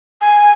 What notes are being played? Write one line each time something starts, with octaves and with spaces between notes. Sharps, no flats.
G#5